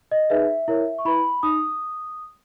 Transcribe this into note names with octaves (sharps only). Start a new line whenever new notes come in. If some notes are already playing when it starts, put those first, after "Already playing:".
D#5
D#4 G#4 B4 E5
E4 A#4 C#5
C#6
E4 B4 B5
D#4 D#6